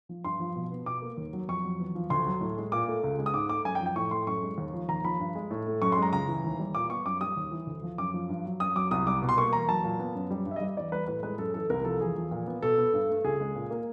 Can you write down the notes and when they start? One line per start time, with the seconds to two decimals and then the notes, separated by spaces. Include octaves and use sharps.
0.09 F3
0.25 G2 C6
0.40 F3
0.56 B2
0.71 B3
0.86 B2 D6
1.02 A#3
1.17 D#2
1.33 F#3
1.48 F2 C#6
1.64 F#3
1.79 E2
1.95 F3
2.10 D2 C6
2.26 F#3
2.41 A2
2.57 G#3
2.72 A#2 D6
2.88 A3
3.04 C#2
3.18 G#3
3.26 D#6
3.34 G#2 D6
3.49 A3 D6
3.65 F#2 G#5
3.75 G5
3.80 F3
3.86 G5
3.96 A2 C#6
4.11 A3 C6
4.27 F#2 C#6
4.42 G#3
4.58 D#2
4.73 F3
4.89 D#2 A#5
5.04 F3 B5
5.20 G2
5.35 G#3
5.51 A2
5.66 A3
5.82 F#2 C#6
5.92 C6
5.97 G#3
6.02 A#5
6.12 C#2 A#5
6.28 E3
6.44 D#2
6.59 G3
6.75 A#2 D6
6.90 B3 C#6
7.05 F#2 D6
7.21 G3 D#6
7.37 D#2
7.51 E3
7.67 D2
7.83 F3
7.98 F#2 D6
8.14 F3
8.29 G2
8.45 F#3
8.60 F#2 D#6
8.75 F#3 D6
8.91 C2 D#6
9.07 G3 D6
9.22 B2
9.29 C6
9.37 A#3 C#6
9.53 E2 A#5
9.68 F#3 A5
9.84 A#2
9.99 B3
10.15 F#2
10.31 G3
10.46 G2
10.51 E5
10.56 D#5
10.61 G3
10.77 E2 D5
10.92 G3 B4
11.08 A2 B4
11.23 G#3 B4
11.39 F#2 A4
11.54 E3 A4
11.70 C2 A#4
11.85 F3 A4
12.01 E2 G#4
12.16 F3
12.31 A#2
12.47 B3
12.62 B2 A4
12.78 B3
12.94 G2
13.09 A3
13.25 C#2 G#4
13.40 G#3
13.55 A#2
13.71 A#3